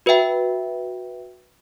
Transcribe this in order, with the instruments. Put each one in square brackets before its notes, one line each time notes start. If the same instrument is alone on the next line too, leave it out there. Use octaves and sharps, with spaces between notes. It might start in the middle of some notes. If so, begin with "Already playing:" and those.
[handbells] F#4 B4 E5 G5